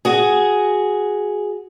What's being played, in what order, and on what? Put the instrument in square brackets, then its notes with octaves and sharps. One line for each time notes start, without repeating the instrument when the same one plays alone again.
[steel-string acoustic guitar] F#4 G#4